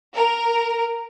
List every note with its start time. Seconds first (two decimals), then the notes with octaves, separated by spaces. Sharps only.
0.16 A#4